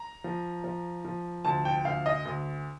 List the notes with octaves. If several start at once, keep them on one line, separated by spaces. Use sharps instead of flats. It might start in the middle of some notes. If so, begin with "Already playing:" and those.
Already playing: A#5
F3
F3
F3
D2 A5
G5
D2 F5
D#5
D2